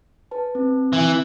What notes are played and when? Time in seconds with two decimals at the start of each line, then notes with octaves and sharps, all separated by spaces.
0.31 B4 A5
0.55 C4
0.93 E3